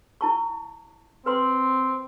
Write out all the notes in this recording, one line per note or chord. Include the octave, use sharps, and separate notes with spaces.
E4 A5 C#6
C4 B4 C6